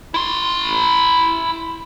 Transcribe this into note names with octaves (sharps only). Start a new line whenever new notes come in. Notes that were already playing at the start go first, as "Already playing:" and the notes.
E4 C6